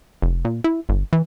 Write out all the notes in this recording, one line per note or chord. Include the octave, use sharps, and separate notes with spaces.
F1
A#2
E4
G1
E3